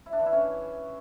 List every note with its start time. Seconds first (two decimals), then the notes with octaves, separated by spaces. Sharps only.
0.06 E4
0.13 D4
0.19 E3
0.26 E4
0.33 C#4